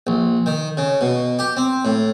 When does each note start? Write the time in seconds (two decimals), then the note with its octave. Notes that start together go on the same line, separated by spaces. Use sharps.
0.07 A#1
0.46 D#3
0.77 C#3
1.01 B2
1.39 G4
1.57 C4
1.85 A2